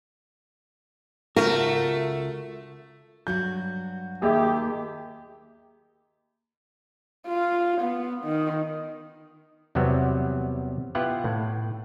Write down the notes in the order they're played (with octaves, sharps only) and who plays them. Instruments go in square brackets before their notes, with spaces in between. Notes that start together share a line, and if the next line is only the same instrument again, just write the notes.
[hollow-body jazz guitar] C#2 F4 F#4 [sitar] A3 [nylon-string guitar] A#4
[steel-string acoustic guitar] G2 F#3 F#4 [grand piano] G6
[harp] D#2 [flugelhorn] G4 [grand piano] G#4 E5
[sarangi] F4
B3
D#3
[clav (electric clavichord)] E2 C3 F#3 G3 B3
B3 E4 F4 G4 F#5 G5
A2